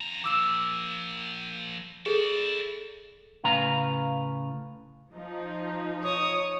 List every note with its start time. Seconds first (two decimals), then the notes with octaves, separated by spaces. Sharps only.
0.01 F2 A#5
0.24 F3 A#3 D6 E6 E7
2.06 E4 G#4 A4 D5
3.44 A2 C#3 B4 F5 A#5
5.14 F3 D#4
6.03 C#5 D#6